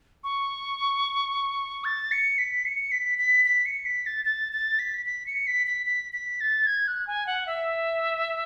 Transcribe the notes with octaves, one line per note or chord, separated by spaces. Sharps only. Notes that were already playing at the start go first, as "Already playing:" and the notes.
C#6
A6
C#7
B6
C#7
B6
B6
B6
C#7
B6
A6
A6
A6
B6
B6
C#7
B6
B6
B6
B6
A6
G#6
F#6
G#5
F#5
E5